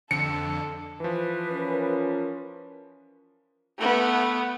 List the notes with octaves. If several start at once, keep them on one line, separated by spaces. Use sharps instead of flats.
F2 D3 A4 C#7
E3 F3 B4
C#4 F4 A#4
A3 B3